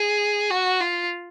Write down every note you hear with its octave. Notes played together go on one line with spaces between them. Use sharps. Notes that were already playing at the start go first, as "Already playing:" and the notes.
Already playing: G#4
F#4
F4